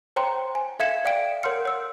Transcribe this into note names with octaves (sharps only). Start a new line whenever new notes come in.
C5 C#5 G5 A#5 C6
G#5
A4 E5 F5 G#6 C#7 E7
D5 F5 G5 D7
A#4 C#5 F#5 C6 F6 C#7
C#5 E6